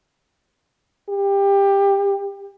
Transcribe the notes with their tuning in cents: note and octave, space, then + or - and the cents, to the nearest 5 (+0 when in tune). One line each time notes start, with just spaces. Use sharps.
G4 +20